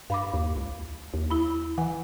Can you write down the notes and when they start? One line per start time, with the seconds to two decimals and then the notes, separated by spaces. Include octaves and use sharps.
0.10 G2 F5 B5 D6
0.33 D#2
0.57 C#2
1.14 D#2
1.30 E4 B5
1.78 E3 F#5 G#5